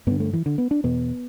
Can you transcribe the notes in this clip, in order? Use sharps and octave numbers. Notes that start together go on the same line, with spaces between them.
G2 D3 B3
A3
E3
D3
B3
D4
E2 B2 B3